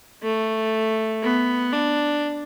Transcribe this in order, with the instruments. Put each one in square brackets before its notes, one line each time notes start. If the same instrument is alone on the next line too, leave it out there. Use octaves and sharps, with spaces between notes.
[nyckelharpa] A3
B3
D4